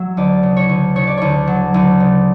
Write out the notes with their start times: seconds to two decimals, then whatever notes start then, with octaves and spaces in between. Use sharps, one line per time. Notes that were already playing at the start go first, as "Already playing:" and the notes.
Already playing: F#3 E5
0.17 D2 D5
0.43 C#3
0.57 C#5
0.69 D2
0.96 C#3 C#5
1.07 D5
1.17 D2 C#5
1.47 F#3
1.74 D2
2.00 C#3